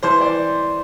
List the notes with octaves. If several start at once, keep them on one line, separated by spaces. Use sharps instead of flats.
E3 C5
D5